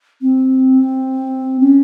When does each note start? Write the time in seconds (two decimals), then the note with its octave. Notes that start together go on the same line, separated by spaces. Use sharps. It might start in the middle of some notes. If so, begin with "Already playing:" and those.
0.21 C4
1.60 C#4